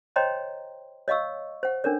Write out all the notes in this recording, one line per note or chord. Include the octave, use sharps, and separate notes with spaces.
C5 C#5 D#5 G5 A#5 C6
C#5 D#5 F5 C#6 E6
C5 F#5
C#4 D4 A4 A#4 C#5